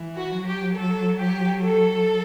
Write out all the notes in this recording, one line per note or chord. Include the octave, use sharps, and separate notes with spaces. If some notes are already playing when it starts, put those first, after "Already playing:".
Already playing: E3
F#4
F#3
G4
A4
G4
A4